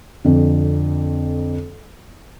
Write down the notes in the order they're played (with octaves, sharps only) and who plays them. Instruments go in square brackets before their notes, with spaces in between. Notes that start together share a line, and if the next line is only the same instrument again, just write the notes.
[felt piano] F2 D3